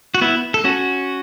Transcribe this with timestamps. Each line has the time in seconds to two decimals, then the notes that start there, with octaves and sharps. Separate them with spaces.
0.15 F#4
0.21 B3 E4
0.54 A4
0.65 C#4 F#4